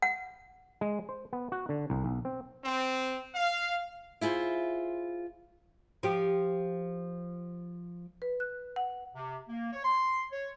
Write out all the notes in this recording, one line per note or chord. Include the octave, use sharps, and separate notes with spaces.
F#5
G#3
C5
B3
F#4
D3
C2
B1
C4
C4
F5
E4 F4 G#4 C5
F3 G4
B4
F#6
F#5
C3
A#3
C#5
C6
C#5